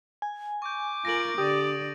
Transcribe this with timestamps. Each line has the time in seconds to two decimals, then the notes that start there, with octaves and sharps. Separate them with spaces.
0.22 G#5
0.62 C#6 D6 G6
1.05 F4 A#4 A#6 D7 F#7
1.38 D3 G4 D5 D#6 D#7